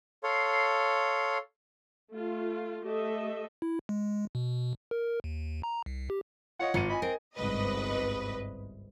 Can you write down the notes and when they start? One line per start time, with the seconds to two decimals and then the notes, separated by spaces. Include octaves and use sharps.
0.23 A4 C#5 F5 C6
2.11 A3 F4
2.86 A3 G4 A4 D#5 E5
3.62 E4
3.89 G#3
4.35 B2
4.91 A#4
5.24 D#2
5.63 A#5
5.86 C2
6.10 G4
6.59 F4 C#5 D#5 F#5
6.74 G#1 F4 C#7 D#7
6.89 D#5 G#5 B5
7.02 C4 A#4
7.36 G1 C2 G#2 B4 D#5